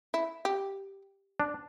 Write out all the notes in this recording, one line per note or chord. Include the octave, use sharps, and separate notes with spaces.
E4
G4
D4